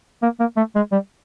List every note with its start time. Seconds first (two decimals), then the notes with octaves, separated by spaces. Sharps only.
0.23 A#3
0.40 A#3
0.57 A3
0.75 G#3
0.92 G3